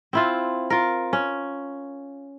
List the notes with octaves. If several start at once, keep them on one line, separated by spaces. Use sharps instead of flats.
C4 E4 F4
F4 A#4
C#4